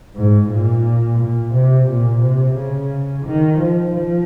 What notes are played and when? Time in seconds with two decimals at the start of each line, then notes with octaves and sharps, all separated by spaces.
0.15 G#2
0.49 A#2
1.18 A#2
1.53 C3
1.87 A#2
2.21 C3
2.55 C#3
3.25 D#3
3.59 F3
3.93 F3